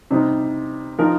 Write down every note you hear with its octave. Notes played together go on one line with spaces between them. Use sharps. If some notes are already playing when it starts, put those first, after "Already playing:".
C3 G3 D#4 C5
F3 D#4 A#4